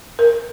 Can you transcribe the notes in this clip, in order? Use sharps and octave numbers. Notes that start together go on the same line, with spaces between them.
A#4